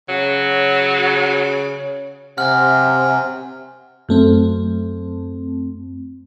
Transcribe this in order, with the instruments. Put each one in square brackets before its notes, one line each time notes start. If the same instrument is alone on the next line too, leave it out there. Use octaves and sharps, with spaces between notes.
[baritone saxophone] C#3 [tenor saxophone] F#3
[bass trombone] C3 [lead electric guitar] F#5 G#5 [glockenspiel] F6
[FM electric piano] F#2 A3 C4